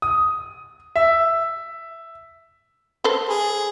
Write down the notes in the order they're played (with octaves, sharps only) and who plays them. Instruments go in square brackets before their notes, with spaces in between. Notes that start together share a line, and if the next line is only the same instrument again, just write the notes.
[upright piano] D#6
E5
[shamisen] A4 B4 C5
[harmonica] G#4